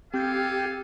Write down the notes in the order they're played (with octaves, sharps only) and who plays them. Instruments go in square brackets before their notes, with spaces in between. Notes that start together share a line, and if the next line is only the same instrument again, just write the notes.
[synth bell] C4 G6 A6 [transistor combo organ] G4 [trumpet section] A4 F5 G#5